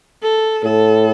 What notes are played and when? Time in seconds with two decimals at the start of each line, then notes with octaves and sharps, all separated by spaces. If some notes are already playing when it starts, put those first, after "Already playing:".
0.23 A4
0.64 A2 A4